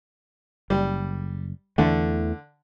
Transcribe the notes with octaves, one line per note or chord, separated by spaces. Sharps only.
F#1 G3
E2 D3 E3 A3